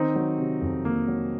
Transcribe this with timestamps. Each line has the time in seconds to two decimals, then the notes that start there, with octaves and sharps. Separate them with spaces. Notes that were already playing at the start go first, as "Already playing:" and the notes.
Already playing: D#3 C4 D#4
0.16 F#3
0.38 C3
0.62 F2
0.84 D#3 A#3
1.08 F#3